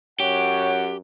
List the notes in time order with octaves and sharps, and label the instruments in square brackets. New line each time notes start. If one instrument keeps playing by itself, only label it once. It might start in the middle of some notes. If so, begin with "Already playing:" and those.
[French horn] F#2 [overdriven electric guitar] G4 [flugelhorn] C#5 [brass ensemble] F#5